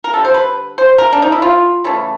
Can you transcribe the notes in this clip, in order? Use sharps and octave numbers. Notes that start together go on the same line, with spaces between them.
A#4
D3 G3 A#3 A4
C5
B4
C5
A#4
D4
D#4
E4
F4
C#3 E3 A3